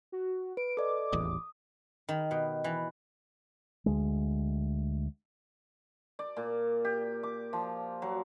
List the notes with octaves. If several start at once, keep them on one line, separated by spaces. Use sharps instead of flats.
F#4
B4 D7
A4 D5 D#5 D6
D#1 A1 E2 D#6
D#3
B2
E3
D2 G#3
D5
A#2
G4
D6
F3
F#3